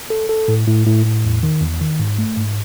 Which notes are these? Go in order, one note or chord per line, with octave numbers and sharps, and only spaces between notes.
A4
A4
A2
A2
A2
A2
E2
D#3
E2
D#3
G#2
A3
G#2